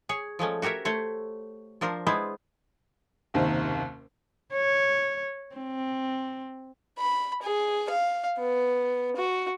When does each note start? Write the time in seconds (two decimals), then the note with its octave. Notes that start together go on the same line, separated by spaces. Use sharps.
0.09 G#4 C#5
0.39 F3 G#3 A3 C#4
0.62 F#4 G4 A#4 C#5 E5
0.85 A3 C5 C#5
1.81 F3 D4 A#4 C5
2.07 G#3 B3 E4 C5
3.34 F#1 D#2 C3 D#3
4.53 C#5
5.56 C4
6.98 B5
7.42 G#4
7.89 F5
8.38 B3
9.16 F#4